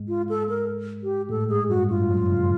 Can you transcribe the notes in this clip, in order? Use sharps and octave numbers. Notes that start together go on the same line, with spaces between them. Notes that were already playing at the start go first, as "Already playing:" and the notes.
Already playing: G#2 G#3
F4
A4
A#4
G4
A2 A3 A4
G#2 G#3 G#4
G2 G3 F#4
G2 G3 F4
F#2 F#3
C#3